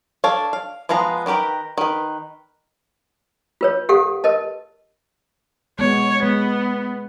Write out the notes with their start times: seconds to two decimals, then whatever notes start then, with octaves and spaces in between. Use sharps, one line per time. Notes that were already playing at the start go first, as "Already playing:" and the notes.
0.24 D4 A4 C#5 F5
0.53 F5
0.89 F3 G#3 B3 F5 A#5
1.26 D#3 F#4 G4 A#4 B4
1.78 D#3 B4
3.61 F4 B4 C#5
3.89 G4 A4 A#4 F5 F#5 C#6
4.24 A#4 B4 D#5 A5
5.79 G#3 B3 C#5
6.23 G#3 B3